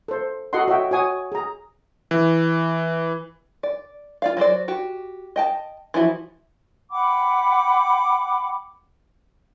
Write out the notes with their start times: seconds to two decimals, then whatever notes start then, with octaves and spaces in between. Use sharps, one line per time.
0.08 A4 C5
0.53 F#4 A4 D#5 F#5 C6
0.68 F#4 C#5 D#5 E5 G5
0.91 F#4 C#5 G#5 D#6
1.32 G#4 A#5
2.11 E3
3.63 D5
4.22 F4 D5 F5
4.37 F#3 F#4 C5 D5
4.68 F#4 G4
5.36 D#5 G5 A5
5.94 E3 F3 E4 F#4
6.91 F#5 G5 B5 D6